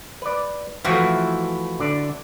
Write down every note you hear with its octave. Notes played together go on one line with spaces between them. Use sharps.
B4 D5
E3 F3 A3 E4 F#4
D3 D5